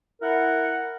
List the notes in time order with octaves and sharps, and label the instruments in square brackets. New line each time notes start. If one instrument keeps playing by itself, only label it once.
[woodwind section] E4 A#4 F#5